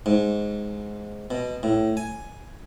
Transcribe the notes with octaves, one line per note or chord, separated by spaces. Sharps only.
G#2
B2
A2
G#5